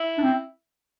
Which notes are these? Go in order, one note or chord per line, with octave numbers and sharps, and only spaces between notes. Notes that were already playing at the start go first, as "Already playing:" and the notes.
Already playing: E4
D4
C4